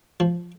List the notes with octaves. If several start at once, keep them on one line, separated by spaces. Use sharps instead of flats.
F3